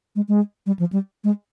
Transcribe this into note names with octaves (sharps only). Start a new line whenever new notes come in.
G#3
G#3
G3
F3
G3
G#3